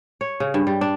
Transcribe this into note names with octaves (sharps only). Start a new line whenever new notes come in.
C#5
C#3
G2
G3
D4